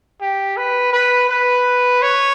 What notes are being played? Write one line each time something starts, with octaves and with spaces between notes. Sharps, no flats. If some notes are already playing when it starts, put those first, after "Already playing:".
G4
B4
B4
B4
C#5